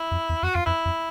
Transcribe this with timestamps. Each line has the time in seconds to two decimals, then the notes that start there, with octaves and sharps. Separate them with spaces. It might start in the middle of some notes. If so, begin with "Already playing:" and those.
Already playing: E4
0.11 F2
0.29 E2
0.43 F2 F#4
0.55 F2 F4
0.66 F2 E4
0.86 F2